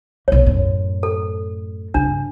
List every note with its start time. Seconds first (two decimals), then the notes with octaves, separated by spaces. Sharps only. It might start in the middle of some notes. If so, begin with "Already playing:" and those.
0.28 B1 A#3 C#5
0.46 F#2 A2
1.03 A4
1.94 G2 C#3 D4